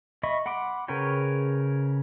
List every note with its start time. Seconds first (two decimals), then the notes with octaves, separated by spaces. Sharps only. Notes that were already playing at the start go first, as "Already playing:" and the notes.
0.23 D#5 E5 B5 C#6
0.46 F#5 B5 C6 D6
0.88 C#3 A#4 B4 C#5 G5